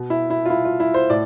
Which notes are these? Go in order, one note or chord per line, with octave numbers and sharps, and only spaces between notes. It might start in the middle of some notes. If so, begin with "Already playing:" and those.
Already playing: B2
E4
E4
F4
E4
F4
E4
C5
A2 D5